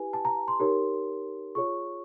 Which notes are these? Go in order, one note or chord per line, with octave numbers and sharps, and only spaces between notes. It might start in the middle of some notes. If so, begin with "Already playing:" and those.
Already playing: E4 G4 B4 G#5
A5
A#5
C6
D#4 G4 A#4 C#5
F4 G#4 C#5 C#6